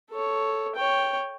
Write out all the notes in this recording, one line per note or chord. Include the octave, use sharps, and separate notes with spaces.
A4 C#5
C#5 G5